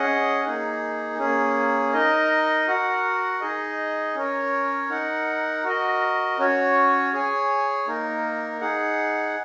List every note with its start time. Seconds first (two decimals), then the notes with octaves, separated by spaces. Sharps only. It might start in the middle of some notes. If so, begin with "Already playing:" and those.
Already playing: C#4 G#4 D#5 F#5
0.45 A#3 D#4 G#4
1.19 A#3 C#4 G#4
1.93 D#4 A#4 D#5
2.68 F#4 A#4 F#5
3.41 D#4 G#4 D#5
4.15 C#4 A#4 C#5
4.89 D#4 A#4 F#5
5.64 F#4 A#4 D#5
6.39 C#4 F#4 C#5
7.13 G#4 C#5 G#5
7.87 A#3 D#4 A#4
8.61 D#4 G#4 F#5